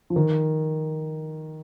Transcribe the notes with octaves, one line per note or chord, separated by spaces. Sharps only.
F3
D#3